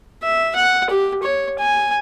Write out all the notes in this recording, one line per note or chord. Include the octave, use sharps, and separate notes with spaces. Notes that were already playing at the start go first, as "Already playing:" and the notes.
E5
F#5
G4
C#5
G#5